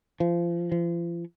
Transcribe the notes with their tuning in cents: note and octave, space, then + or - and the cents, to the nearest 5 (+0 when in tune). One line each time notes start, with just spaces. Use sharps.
F3 -25
F3 -40